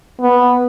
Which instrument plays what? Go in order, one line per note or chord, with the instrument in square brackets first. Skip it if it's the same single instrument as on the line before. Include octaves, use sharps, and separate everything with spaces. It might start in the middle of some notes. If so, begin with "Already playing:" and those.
[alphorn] B3